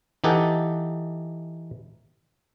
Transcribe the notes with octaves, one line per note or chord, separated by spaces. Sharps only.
E3 D#4 G4 A4 F#5 G#5